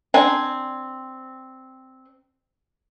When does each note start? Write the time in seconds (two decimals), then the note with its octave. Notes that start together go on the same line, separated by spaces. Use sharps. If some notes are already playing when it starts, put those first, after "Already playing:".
0.14 C4 D4 G#5